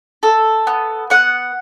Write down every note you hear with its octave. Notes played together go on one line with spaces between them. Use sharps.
A4 E6
B3
B3 F#5